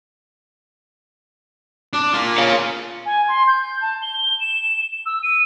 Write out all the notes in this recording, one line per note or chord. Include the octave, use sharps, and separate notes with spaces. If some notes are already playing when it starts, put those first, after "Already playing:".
D4
A#3 F4
C#5 F5
G#5
C6
G6
A5
G7
E7
E6
D#7